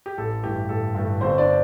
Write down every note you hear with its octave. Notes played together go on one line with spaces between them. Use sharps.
G4
A1 A4
G2 E3 A3 G4
A1 A4
G2 E3 A3
G1 C4 C5
D4 D5